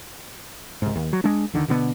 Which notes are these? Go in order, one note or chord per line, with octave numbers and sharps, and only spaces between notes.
C2 G#2
D#2
F#3
G#3 D4
D2 D3 D#3
B2 D3 B3